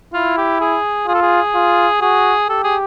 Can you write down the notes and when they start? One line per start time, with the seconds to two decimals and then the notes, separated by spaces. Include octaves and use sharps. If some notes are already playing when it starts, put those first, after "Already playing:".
0.14 E4 F4
0.38 G4
0.61 G#4
1.08 F4 G#4
1.15 A4
1.22 G#4
1.55 F4
2.01 F#4 G#4
2.49 G4 A4
2.64 G#4